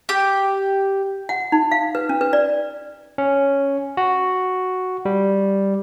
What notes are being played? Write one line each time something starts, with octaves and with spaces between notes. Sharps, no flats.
G4
F#5
D#4
F5
B4
C#4
B4
D5
C#4
F#4
G3